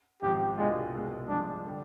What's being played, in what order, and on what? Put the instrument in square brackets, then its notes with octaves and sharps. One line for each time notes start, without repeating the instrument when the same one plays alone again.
[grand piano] G#1 G#2 F3 C4 [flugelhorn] G4
[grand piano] C2 B2 G3 D4 F4 [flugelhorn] G#3
[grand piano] C2 B2 G#3
[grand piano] G2 F3 G#3 [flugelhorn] D4
[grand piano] D3 G3